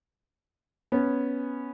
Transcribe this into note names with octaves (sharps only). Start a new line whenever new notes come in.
B3 C#4